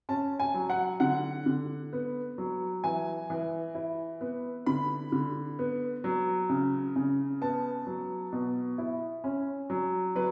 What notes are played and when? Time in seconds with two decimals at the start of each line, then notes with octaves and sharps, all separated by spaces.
0.09 C#4 A5
0.40 G#5
0.54 F#3
0.70 F#5
1.00 D3 F#5
1.46 D3
1.93 B3
2.38 F#3
2.84 E3 G#5
3.30 E3
3.75 E4
4.21 B3
4.66 D3 B5
5.12 D3
5.59 B3
6.04 F#3
6.49 C#3
6.96 C#3
7.41 B3 A5
7.87 F#3
8.33 B2
8.78 E4
9.24 C#4
9.70 F#3
10.15 F#3 B4